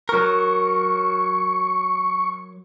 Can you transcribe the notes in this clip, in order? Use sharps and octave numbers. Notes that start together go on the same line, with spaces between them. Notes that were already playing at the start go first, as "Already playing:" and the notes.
F#3 A#4 C#6